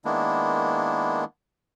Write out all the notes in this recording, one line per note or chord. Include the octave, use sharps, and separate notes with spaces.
D#3 G#3 A#3 B3 D4 E4